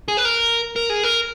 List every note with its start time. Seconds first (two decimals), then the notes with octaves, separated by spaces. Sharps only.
0.08 G#4
0.17 B4
0.25 A#4
0.76 A#4
0.90 G#4
1.03 A#4